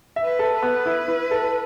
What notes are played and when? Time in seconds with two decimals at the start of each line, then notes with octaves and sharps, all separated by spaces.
0.16 E5
0.24 B4
0.39 A4
0.55 B4
0.62 B3
0.86 E4
1.08 E4
1.31 A4